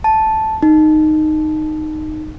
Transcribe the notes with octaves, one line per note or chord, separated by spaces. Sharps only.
A5
D#4